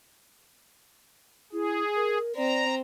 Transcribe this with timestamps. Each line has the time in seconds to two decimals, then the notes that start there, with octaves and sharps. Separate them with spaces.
1.53 E4 G#4
1.96 A#4
2.36 C4 D5 A#5